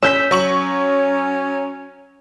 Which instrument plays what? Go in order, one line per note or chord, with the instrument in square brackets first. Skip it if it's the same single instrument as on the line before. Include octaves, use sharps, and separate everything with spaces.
[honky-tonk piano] C#4 [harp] E6 G6 B6
[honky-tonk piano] F#3 C#6 F#7 [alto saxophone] C#4